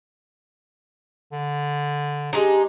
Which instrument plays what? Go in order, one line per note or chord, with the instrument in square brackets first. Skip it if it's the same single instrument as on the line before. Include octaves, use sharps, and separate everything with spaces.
[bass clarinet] D3
[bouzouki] G#3 D#4 [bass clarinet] D4 [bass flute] G4